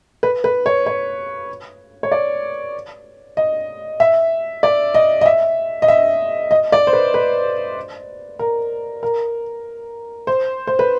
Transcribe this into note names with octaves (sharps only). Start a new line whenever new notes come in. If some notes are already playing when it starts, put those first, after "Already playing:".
B4
B4
C#5
C#5
C#5
D5
D#5
E5
D5
D#5
D#5
E5
D#5
E5
D#5
D5
C5
B4
B4
A#4
A#4
C5
C5
B4